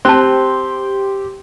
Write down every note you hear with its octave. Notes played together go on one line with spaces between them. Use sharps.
C4 G4 C5 A5 C6